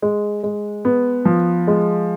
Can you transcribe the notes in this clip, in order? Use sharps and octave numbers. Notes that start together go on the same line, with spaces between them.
G#3
G#3
B3
F3
G#3